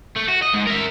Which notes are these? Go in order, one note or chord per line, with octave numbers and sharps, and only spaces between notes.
A3
F#4
D#5
G#2
A#4 E5